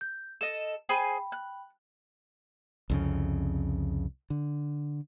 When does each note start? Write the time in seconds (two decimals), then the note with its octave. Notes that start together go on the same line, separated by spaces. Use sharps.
0.01 G6
0.41 A4 D#5 E7
0.89 G#4 C5 G5 G#5 B5
1.32 F#6
2.90 C2 F2 C#3
4.30 D3